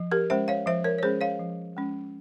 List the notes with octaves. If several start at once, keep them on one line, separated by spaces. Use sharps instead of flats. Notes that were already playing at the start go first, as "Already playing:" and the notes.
Already playing: F3
G4 A#4
G#3 C#4 C5 E5
C#5 F5
F3 C5 E5
A#4 C#5
C#5
G#3 C#4 G#4 C5
C#5 F5
F3
G#3 C#4